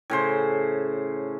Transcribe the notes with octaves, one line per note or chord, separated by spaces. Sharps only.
A2 C#3 C5